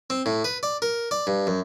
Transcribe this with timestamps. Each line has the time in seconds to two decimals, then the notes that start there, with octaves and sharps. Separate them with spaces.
0.10 C4
0.26 A2
0.44 B4
0.63 D5
0.82 A#4
1.11 D5
1.27 G2
1.47 F#2